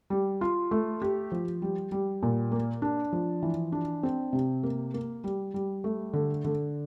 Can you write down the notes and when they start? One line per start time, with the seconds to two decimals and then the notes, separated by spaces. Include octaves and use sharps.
0.10 G3
0.41 F4
0.71 A3
1.02 G4
1.32 F3
1.62 G3
1.92 G3
2.23 A#2
2.52 A#3
2.82 D4
3.13 F3
3.43 E3
3.72 D4
4.03 C4
4.33 C3
4.63 A#3
4.94 A#3
5.24 G3
5.54 G3
5.84 A3
6.13 D3
6.45 D3